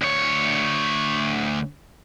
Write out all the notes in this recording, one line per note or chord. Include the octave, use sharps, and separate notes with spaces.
D2 C#5